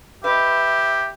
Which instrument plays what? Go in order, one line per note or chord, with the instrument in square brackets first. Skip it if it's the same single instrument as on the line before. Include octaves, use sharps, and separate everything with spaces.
[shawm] G4 [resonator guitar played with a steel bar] B4 D#5 [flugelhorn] E5